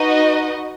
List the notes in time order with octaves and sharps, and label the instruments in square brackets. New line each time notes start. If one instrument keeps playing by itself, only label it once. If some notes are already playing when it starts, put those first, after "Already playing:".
Already playing: [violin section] D#4 F#4 B4 D#5